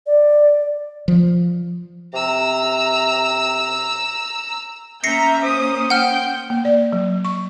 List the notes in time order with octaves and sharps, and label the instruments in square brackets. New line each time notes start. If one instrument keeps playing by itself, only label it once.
[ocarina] D5
[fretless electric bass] F3
[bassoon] C3 [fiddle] A#5 E6
[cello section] A#3 C#4 [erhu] E5 [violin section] A#5 G6 [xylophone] A#6 C7 C#7
[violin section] C5 [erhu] D#6
[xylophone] F#5 F6 [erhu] G5
[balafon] A#3
D5
F#3
C#6